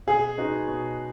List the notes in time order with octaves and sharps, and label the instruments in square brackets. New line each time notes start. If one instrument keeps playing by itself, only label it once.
[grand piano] B2 [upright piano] G#4
[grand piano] G#3 B3 D#4 F#4
B2